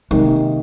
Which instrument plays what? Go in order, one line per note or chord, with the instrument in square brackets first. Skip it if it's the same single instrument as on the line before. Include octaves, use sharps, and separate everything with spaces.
[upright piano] C3 D#3 A#3 D#4 [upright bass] G#3